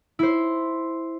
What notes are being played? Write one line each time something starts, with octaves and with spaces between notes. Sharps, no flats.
E4 C5